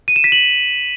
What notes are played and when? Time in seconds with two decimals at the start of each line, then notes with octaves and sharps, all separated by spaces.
0.08 D#7
0.16 E7
0.24 B6
0.32 F#7